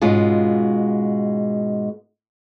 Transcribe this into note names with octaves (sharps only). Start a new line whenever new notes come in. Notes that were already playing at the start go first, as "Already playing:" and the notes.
G#2 B2 G#3 C#4 F4